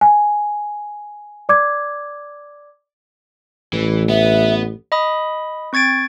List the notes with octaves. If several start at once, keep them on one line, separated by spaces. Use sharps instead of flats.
G#5
D5 D6 G#6
A1 E3
B3 E5
D#5 B5 D#6
C4 C#6 G#6 A6 D7